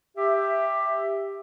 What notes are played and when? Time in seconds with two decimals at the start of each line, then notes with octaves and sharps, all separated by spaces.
0.17 G4 E5